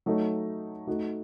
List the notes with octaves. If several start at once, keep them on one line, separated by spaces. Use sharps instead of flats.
F#3 A3 D#4
A3 D#4 F#4